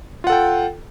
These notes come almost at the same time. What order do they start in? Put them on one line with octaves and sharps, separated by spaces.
F4 F#5 A4 G5